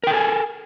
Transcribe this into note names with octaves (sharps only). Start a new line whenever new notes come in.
A4 A#4 G5 G#5